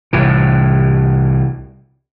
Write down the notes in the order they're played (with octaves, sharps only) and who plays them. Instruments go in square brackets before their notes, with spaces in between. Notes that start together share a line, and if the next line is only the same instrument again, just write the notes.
[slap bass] C2 A2 E3